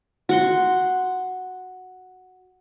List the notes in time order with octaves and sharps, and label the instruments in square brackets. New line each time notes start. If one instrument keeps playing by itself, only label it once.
[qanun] F#4 F#5 C6